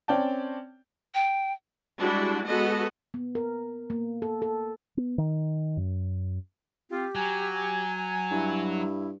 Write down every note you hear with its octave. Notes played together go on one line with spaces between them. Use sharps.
C4 C#4 D5 G5 A5
G5
G3 G#3 D4 E4 F#4
G#3 B3 F#4 A4 D#5
B3
A#4
A#3
A4
A4
B3
D#3
F#2
C4 F4 G4
F#3 G#5
G2 E4